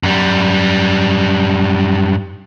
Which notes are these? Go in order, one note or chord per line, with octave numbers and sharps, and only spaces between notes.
F#2 G3